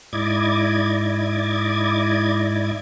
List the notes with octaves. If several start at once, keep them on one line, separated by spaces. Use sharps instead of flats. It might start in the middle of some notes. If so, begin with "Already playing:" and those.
G#2 E4 D5 D#5 D6 G#6